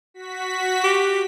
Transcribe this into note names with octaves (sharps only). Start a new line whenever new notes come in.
F#4 B6
G4